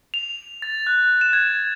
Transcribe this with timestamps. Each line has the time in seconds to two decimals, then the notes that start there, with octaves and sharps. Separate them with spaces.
0.14 F7
0.62 A6
0.87 F#6
1.21 E7
1.33 G#6